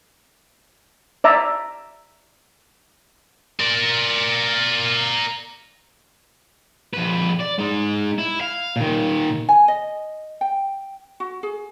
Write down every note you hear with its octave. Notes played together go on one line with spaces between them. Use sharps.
D5 E5 A#5
A#4 D5
F2 B4
D5
G#3 D#4
E4
F5
A#2 D#3
G#5
D#5
G5
F#4
G#4